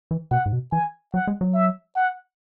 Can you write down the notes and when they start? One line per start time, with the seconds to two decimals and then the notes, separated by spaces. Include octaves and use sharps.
0.11 E3
0.31 B2 F#5
0.46 G#2
0.53 B2
0.72 E3 G#5
1.14 F#3 F#5
1.27 G#3
1.41 F#3
1.54 E5
1.96 F#5